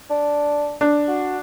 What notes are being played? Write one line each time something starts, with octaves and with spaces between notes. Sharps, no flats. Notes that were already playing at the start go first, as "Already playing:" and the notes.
D4
D4
F#4